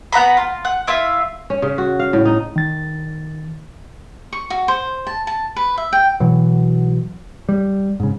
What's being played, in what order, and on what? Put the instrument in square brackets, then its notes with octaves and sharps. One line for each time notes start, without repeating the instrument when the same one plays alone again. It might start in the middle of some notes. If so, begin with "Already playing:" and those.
[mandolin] B3 F#5 A#5 B5
F4
F#5
E4 F4 E5
[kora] C#4
C#3
F#4
F5
A2
D#4
[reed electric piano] D#3 A6
[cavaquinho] C#6
F#4
C5
A5
A5
B4
E5
G5
[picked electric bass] B2 E3 F#3
G3
G#2 C#3